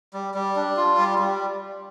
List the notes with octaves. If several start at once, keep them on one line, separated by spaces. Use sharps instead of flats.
G3
G3
D4
F4
G3
G3